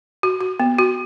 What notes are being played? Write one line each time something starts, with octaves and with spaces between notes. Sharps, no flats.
F#4
F#4
B3
F#4